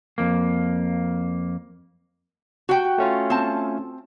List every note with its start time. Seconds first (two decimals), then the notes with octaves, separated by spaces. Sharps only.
0.18 F2 A#3
2.69 F#4 G5
2.98 A3 C#4 F4
3.30 C4 A5